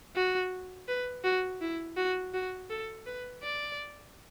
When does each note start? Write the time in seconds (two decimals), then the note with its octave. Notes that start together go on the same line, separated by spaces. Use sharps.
0.16 F#4
0.89 B4
1.24 F#4
1.61 E4
1.97 F#4
2.34 F#4
2.70 A4
3.06 B4
3.43 D5